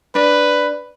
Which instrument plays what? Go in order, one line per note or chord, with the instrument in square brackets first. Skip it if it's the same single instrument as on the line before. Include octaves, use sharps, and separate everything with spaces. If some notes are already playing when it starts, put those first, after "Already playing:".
[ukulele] D4 [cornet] B4